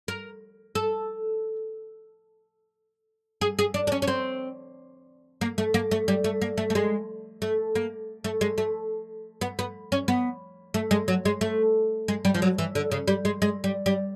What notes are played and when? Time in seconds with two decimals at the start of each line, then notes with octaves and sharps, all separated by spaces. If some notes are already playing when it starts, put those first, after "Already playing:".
0.08 A#4
0.75 A4
3.41 G#4
3.59 G#4
3.74 D4
3.87 D4
3.92 C#4
4.02 C#4
4.08 C4
5.41 A#3
5.58 A3
5.74 A#3
5.91 A3
6.08 G3
6.24 A3
6.42 A#3
6.58 A3
6.70 A3
6.75 G#3
7.42 A3
7.75 A#3
8.24 A3
8.41 G#3
8.58 A3
9.41 B3
9.59 B3
9.92 C#4
10.08 B3
10.74 A3
10.91 G#3
11.08 F#3
11.25 G#3
11.41 A3
12.08 G#3
12.25 G3
12.34 F3
12.42 F#3
12.58 E3
12.75 D3
12.92 C#3
13.08 G3
13.25 G#3
13.42 G#3
13.64 G3
13.86 G3